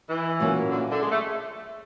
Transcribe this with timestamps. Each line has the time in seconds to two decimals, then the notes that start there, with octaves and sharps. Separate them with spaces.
0.09 E3
0.40 A#2 F#3 A#3 C#4
0.71 D3
0.91 D3
1.02 G#3
1.11 A3